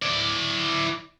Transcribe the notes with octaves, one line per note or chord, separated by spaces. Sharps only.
E4 D5